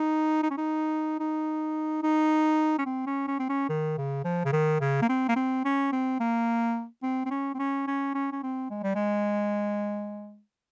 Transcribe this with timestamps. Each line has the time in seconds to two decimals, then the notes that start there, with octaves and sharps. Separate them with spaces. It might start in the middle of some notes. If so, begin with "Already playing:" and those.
Already playing: D#4
0.43 D#4
0.50 C#4
0.58 D#4
1.20 D#4
2.03 D#4
2.78 C#4
2.86 C4
3.06 C#4
3.28 C#4
3.39 C4
3.49 C#4
3.69 D#3
3.98 C#3
4.25 F3
4.45 C#3
4.52 D#3
4.80 C#3
5.02 A#3
5.09 C4
5.28 A#3
5.36 C4
5.65 C#4
5.93 C4
6.20 A#3
7.03 C4
7.26 C4
7.31 C#4
7.54 C4
7.59 C#4
7.87 C#4
8.14 C#4
8.32 C#4
8.43 C4
8.70 G#3
8.83 G3
8.95 G#3